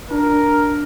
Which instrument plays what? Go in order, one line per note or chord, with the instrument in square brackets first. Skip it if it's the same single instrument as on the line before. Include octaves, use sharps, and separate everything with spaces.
[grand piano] D4 [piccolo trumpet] A#4